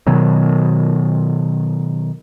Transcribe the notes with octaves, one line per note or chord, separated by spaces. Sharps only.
B2 D#3 F#3